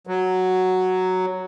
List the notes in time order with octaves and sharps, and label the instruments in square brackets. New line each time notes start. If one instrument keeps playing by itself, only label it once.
[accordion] F#3